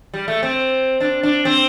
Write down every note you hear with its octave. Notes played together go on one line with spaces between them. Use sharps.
G3
A3
C4
D4
D4
C4